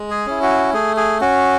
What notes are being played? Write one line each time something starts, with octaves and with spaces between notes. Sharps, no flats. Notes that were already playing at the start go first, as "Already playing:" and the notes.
Already playing: G#3
G#4
C#4 E4
F#4
A3 G#4
G#4
C#4 F#4